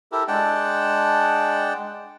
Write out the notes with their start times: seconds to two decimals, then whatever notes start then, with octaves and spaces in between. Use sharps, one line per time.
0.12 E4 G4 A4 A#4
0.28 G#3 D4 F#5 G5 A5